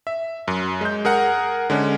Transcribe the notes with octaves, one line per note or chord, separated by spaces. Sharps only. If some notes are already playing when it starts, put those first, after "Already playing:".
E5
F#2
G#3 G6
G#4 A#4 F#5
D3 G#3 C#4